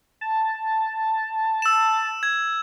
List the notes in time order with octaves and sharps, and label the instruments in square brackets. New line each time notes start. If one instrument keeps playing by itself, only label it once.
[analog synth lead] A5
[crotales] E6 E7
G#6